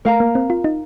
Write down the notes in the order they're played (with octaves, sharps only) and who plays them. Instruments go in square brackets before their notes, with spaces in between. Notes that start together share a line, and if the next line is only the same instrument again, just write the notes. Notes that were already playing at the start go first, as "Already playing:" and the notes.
[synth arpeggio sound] A3 [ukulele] A#4 F5 A#5
[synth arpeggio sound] A#3
C4
F4
D#4